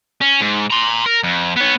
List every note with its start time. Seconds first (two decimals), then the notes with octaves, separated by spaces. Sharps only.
0.21 C#4
0.41 G#2
0.70 A#5 C6
1.06 A#4
1.24 F2
1.57 B3 C#5